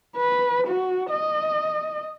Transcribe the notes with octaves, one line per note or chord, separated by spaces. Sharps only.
B4
F#4
D#5